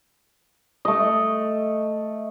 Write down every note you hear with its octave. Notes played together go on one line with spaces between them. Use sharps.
A3 D#5